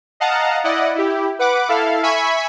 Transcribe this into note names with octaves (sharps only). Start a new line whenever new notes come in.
D#5 F5 F#5 A5 A#5
E4 D5 D#5 F#5
E4 G4
B4 F#5 D6
E4 A4 F5
E5 G#5 B5 C#6 G#6 B6